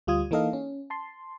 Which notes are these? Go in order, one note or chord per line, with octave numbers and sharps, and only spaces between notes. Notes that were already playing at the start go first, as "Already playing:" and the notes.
D2 G3 F4 D#6 G#6
E3 A#3 D#4 A4 D#5 F5
C#4
A5 C6